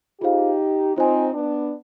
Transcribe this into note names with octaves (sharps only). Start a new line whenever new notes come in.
D#4 F4 G4 G#4 C5 F5
C4 D#4 F4 C5 D#5 G#5
B3 D4